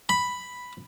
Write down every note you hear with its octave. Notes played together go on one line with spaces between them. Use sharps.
B5